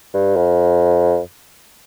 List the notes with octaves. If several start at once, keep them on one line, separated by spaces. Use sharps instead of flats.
G2
F2